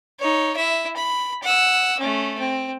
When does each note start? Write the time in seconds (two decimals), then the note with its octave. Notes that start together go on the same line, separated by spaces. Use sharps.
0.20 D#4 C#5
0.56 E4 E5
0.96 B5
1.43 F#5 E6
1.99 A3 C#4
2.39 C4